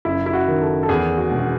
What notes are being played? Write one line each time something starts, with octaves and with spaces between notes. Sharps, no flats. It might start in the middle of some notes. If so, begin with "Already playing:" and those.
F#1 E4
E4
F#4
D#3
A4
A4
E2 G#4
F#4
E1
F#4